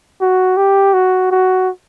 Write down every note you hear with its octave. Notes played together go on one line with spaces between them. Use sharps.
F#4
G4
F#4
F#4